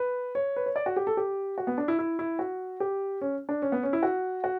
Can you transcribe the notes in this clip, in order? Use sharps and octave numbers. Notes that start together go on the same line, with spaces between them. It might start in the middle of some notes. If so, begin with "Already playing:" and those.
Already playing: B4
C#5
B4
C#5
D5
F#4
G4
A4
G4
F#4
B3
D4
E4
E4
E4
F#4
G4
C#4
D4
C#4
B3
C#4
E4
F#4
F#4